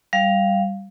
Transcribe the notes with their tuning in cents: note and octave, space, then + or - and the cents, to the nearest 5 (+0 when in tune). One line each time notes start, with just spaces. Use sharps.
G3 +0 F5 +0